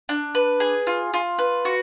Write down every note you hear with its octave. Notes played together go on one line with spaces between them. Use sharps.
D4
B4
G#4
F4
F4
B4
F#4